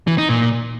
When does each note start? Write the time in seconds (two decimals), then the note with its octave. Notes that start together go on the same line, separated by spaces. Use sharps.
0.07 E3
0.18 D#4
0.29 A#2